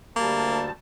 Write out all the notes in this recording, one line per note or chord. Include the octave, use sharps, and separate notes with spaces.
D2 G3 A#3 A5